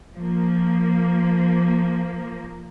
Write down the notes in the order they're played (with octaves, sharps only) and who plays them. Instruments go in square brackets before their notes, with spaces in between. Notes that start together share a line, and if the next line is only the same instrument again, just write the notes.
[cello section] F3 A#3